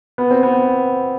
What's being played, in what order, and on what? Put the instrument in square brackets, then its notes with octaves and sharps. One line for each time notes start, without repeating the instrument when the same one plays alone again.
[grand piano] B3
C4
B3